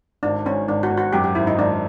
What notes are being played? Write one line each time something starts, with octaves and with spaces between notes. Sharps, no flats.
G#1 D4
G#1 C#4
G#1 D4
F#4
G#1
F#4
F#2 G4
G4
G#1 E4
D#4
G#1 D4